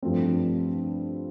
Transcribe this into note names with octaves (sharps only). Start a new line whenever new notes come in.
G2 F3 A3 C4